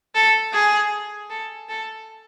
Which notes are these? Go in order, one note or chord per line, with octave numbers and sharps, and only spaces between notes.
A4
G#4
A4
A4